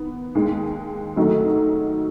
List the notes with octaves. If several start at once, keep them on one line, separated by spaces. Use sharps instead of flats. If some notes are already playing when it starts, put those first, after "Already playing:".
Already playing: D#3 B3
D#2 D#3 G#3
G#2 D#3 F#3 A3 D#4